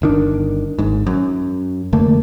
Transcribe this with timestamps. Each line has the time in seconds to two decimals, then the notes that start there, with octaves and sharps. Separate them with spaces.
0.02 G1 D#3 D4
0.78 G#1 G#2
1.07 F#2
1.93 F1 D3 A3 A#3